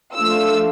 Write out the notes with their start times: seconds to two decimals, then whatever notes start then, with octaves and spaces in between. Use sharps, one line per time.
0.15 F3 A3 D4 F4 E6